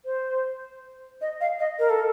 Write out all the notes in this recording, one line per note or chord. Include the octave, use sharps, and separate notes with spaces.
C5
D#5
F5
D#5
A#4
A4